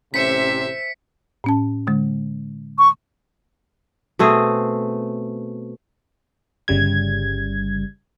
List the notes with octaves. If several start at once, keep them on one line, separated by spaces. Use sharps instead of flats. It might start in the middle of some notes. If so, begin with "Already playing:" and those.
A1 C3 C#4 C5 E5 B6 C#7
A2 C#4 A5
D3 G#3
C#6
B2 A3 C4 G#4
G1 C#3 G3 G#6